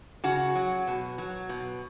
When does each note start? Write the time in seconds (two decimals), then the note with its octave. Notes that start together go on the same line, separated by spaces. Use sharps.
0.24 C#3 F#4
0.55 F#3
0.87 B2
1.18 F#3
1.49 B2